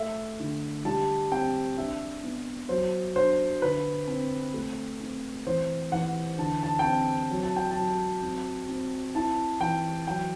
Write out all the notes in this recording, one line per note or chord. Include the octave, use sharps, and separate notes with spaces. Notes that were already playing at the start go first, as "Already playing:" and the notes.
Already playing: A3 E5
D3
G3 A5
C4 G5
D4 E5
B3
F#3 C5
D4 C5
D3 B4
C4
A3
C4
E3 C5
E3 F#5
D3 A5
A5
G5
C4 A5
F#3
A5
G5
A5
F#3
C4
C4
E4 A5
E3 G5
F#3 G5